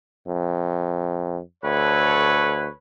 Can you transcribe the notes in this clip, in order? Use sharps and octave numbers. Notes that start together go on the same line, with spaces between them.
F2
D2 A4 B4 C#5